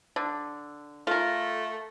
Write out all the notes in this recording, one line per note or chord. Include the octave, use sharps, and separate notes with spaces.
D3
A3 F4 A#4